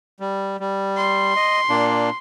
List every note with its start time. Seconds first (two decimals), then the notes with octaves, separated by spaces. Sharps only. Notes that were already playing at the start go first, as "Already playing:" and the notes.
0.20 G3
0.60 G3
0.97 C6
1.36 D#5
1.69 A#2 A#3 D4